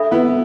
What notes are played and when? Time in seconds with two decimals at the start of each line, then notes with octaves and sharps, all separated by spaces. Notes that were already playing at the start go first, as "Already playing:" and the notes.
Already playing: D4 A4 E5 B5
0.11 B3 E4